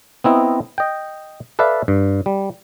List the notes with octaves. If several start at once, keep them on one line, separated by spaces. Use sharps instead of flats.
B3 C4 E4 D#5 A#5
D#5 G5
A4 B4 D5 E5 F5 A5
G2
G3